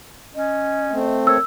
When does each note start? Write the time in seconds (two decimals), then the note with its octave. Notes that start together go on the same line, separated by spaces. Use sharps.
0.35 C#4 D#5
0.91 A3 C4
1.27 A#4 C#5 E6